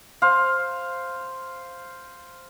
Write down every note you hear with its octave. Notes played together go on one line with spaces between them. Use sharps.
C5 F5